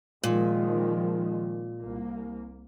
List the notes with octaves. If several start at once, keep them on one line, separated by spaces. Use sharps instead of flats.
A#2 D#3 F3 G#3
C2 A#3